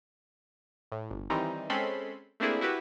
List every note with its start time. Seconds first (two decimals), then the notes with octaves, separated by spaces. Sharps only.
0.92 A2
1.10 G1
1.30 D#3 E3 G3 C4 D#4
1.70 G#3 C4 C#4 A4 B5 C6
2.40 A3 A#3 C4 D4 E4 G#4
2.61 E4 F#4 G4 B4